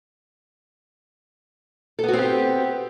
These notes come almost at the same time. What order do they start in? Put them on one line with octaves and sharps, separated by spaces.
A4 B3 F#4 C4 G4